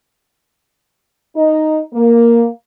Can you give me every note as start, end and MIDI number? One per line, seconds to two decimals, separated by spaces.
1.36 1.80 63
1.94 2.48 58